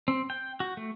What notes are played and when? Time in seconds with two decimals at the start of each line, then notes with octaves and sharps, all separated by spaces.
0.08 C4
0.30 G5
0.60 F#4
0.77 A3